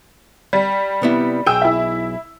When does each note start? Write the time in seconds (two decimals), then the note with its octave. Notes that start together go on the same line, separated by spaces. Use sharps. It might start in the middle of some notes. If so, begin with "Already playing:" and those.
0.53 G3
1.02 C3 B3 E4
1.46 B1 G#4 G5 E6
1.62 E4 E5